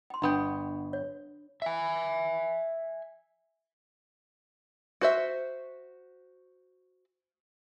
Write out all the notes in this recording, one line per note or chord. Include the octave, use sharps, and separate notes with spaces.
G5 C6
G1 B3 D4 G5 B5 D#6
C#5
E5 G#5
F#4 C5 E5